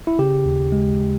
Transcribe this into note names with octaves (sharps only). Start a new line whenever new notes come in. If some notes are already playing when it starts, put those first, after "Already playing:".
E4
C#3 G4
D#2
G#3